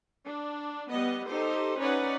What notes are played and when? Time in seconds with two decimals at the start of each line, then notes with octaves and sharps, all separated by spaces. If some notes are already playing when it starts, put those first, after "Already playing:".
0.24 D4
0.90 G3 B3 D#5
1.28 D#4 G4 A4 C5
1.79 C#4 D#4 B4 C#5 D5 F#5